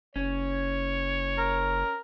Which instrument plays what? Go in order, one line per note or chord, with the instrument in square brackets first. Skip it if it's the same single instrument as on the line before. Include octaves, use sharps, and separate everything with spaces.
[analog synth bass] F#1 [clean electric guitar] C#4 [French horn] C#5
[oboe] A#4